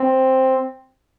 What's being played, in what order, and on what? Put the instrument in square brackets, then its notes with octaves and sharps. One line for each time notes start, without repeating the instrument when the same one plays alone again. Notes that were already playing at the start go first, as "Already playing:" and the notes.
Already playing: [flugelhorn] C4